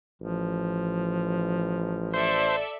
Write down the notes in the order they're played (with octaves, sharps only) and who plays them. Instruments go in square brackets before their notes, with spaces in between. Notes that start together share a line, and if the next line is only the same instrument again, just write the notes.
[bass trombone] A1 [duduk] F3
[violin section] A4 D5 E5 [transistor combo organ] C5